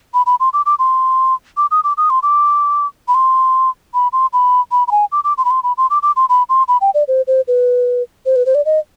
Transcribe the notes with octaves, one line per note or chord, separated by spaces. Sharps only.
B5
B5
C6
D6
D6
C6
D6
D#6
D6
D#6
C6
D6
B5
C6
B5
C6
B5
B5
B5
G#5
D6
D6
C6
B5
C6
B5
C6
D6
D6
C6
B5
C6
B5
G5
D5
C5
C5
B4
C5
B4
C5
D5
D#5